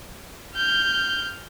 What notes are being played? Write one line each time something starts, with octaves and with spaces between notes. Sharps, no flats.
F6 G6